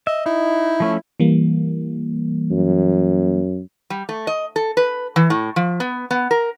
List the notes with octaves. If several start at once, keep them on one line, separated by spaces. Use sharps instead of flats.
D#5 E5
D#4 E4
F3 A3 C#4
E3 G3 A#3
F#2
G3
A3
D#5
A4
B4
E3
A2
F3
B3
B3
A#4